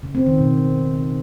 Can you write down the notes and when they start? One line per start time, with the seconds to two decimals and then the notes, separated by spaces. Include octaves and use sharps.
0.03 C#3
0.15 C4
0.26 D#3
0.38 B2